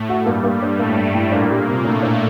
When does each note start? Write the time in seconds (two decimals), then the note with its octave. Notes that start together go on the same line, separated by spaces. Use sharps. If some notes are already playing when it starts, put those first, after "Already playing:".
Already playing: A2 A3
0.09 F#4
0.26 G2 G3 A#3
0.44 A#3
0.62 D4
0.79 A2 A3 A#3
0.97 D4
1.15 A2
1.32 A#2 A#3 D4
1.51 G3
1.68 C3
1.85 A2 A3 D4
2.03 D4